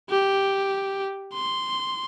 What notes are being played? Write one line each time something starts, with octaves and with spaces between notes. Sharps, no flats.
G4
C6